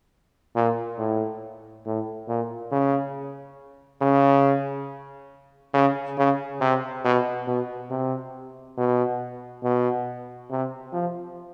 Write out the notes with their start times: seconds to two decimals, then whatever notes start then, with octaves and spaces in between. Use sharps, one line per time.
0.56 A#2
0.98 A2
1.86 A2
2.28 A#2
2.71 C#3
4.01 C#3
5.74 C#3
6.18 C#3
6.61 C3
7.05 B2
7.47 B2
7.90 C3
8.77 B2
9.63 B2
10.50 C3
10.93 F3